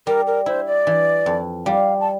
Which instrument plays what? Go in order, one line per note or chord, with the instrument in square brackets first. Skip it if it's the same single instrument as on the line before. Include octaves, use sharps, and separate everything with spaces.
[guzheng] G3 [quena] A#4
[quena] A#4
[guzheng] E4 [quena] C5
[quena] D5
[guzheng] E3
F2
[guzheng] G3 [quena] F5
[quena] A5